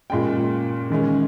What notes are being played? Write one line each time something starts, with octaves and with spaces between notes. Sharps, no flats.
A#2 G#3 C#4 G5
D#3 G#3 C#4